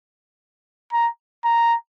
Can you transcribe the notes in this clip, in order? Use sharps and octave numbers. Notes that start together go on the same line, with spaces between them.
A#5
A#5